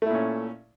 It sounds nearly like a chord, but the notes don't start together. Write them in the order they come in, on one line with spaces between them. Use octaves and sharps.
A3 E4 A#2 C#4